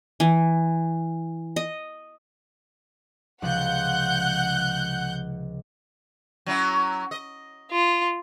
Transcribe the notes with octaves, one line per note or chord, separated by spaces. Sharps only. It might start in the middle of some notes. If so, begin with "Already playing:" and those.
E3
D#5
C#2 C3 F3 F#5 F#6 G6
F#3 C#4 E4
D#5
F4